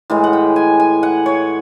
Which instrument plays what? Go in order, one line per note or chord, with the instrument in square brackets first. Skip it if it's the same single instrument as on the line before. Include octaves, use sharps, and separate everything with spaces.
[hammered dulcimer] A2 E3 G#3
F#5
G5
G#5
G#5
F#5
C#5